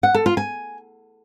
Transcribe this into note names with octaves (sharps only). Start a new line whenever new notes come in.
F#5
A4
F4
G#5